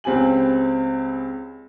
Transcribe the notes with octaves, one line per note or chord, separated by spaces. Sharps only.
C#2 C4 G4 G#5 F#7